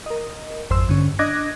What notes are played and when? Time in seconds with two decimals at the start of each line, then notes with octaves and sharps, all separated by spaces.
0.06 A#4 D#5
0.70 G#1 F2 C5 C6 E6
0.89 G2 D3 C#4
1.19 D4 D#5 D6 F#6 G#6 A#6